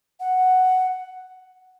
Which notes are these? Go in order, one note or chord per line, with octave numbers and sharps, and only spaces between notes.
F#5